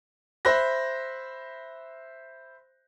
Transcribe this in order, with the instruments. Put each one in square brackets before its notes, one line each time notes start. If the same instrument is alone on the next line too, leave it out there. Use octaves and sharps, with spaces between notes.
[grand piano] C5 E5 B5 F#6 A#6